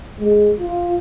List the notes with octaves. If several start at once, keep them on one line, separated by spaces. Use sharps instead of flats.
G#3
F4